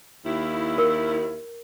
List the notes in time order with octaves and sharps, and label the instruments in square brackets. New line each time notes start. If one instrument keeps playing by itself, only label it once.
[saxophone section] D#2 E4
[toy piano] A#4